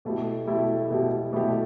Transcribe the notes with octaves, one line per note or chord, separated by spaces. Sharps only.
B2 A3 E4 G4
B2 A3 E4 G4
B2 A3 E4 G4
B2 A3 E4 G4